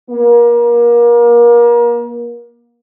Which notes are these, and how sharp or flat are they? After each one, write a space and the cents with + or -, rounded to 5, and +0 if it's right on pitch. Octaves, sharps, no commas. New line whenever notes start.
A#3 +30